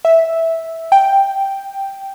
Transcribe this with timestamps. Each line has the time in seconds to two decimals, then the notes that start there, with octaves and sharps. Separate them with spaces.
0.05 E5
0.92 G5